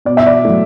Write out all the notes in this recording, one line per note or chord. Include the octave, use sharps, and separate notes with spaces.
B2 D5
E5
D5
F#3 A3